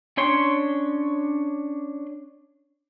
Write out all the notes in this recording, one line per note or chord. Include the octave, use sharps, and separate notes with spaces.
C#4 D4 C#5 C6